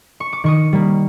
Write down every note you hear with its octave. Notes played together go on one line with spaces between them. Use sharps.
C#6
D6
D#3 C#6 D#6
G3 A#3